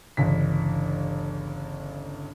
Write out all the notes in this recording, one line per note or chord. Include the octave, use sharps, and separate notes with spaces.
G1 C#2 E3 B6